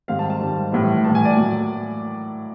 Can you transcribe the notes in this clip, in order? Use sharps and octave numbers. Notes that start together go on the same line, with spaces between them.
G#2 D#3 G3 C4 F5
A5
A5
G#2 D#3 G3 C4
A2 E3 G3
A2 E3 G3 A5
G#5
D5
A2 F#3 A#3